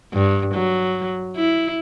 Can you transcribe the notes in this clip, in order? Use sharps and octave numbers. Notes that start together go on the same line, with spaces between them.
G2
F#3
E4